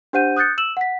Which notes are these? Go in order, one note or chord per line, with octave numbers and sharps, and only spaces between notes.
D4 G4 C5 F#5 G6 D#7
D#6 F#6 G6 A6 C#7
E6 E7 F#7
F#5 B6